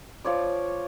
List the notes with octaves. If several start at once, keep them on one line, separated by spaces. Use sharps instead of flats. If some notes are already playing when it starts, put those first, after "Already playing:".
F3 C#5 D5